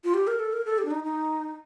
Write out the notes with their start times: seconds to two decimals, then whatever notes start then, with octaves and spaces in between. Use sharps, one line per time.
0.04 F4
0.14 G4
0.27 A#4
0.39 A4
0.53 A#4
0.65 A4
0.78 G4
0.85 D4
0.91 D#4
1.04 D#4